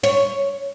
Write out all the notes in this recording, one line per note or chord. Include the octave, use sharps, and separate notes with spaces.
C#5